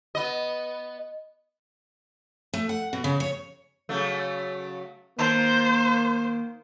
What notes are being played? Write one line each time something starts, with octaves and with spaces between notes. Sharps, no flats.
B3 D#5
A3
F#5
B2
C#3
C#5
C#3 F#3 A3
D#3 A#3 C5